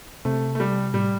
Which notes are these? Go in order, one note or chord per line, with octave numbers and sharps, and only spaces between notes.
C3 A3
A3
G3
A2 G3